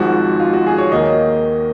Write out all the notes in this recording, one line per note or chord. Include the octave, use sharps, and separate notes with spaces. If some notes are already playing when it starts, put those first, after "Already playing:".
Already playing: G#1 G#2 F3 G#3 F#4
F4
F#4
G#4
C#5
D#2 D#3 A#3 D#5